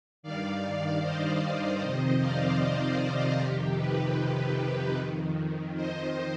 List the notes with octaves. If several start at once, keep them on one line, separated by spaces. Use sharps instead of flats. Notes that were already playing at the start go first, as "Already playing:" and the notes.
G2 D#3 D5 F5
C5 D#5
C5 D#5
F2 C3 D#3 C5 D#5
D5 F5
C5 D#5
C5 D#5
F2 C3 D#3 G4
G4 B4
F2 D#3
C5 D#5